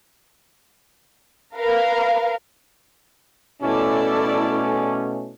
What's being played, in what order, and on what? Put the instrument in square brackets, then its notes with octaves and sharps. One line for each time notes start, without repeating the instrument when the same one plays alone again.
[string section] A#4 B4 F5
[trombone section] B2 A3 C#4 [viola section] E4 A4 D5